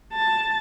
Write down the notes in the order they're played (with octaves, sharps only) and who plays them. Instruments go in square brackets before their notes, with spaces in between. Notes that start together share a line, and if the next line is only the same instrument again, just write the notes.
[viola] A5